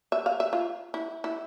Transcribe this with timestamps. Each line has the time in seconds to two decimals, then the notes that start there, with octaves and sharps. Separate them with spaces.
0.12 E5
0.26 F5
0.40 E5
0.53 F4
0.94 E4
1.24 E4